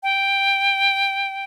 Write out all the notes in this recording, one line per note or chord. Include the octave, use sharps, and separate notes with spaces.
G5